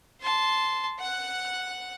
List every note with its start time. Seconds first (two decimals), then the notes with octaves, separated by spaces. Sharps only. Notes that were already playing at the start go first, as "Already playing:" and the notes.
0.21 A5 C6
0.99 F#5 F#6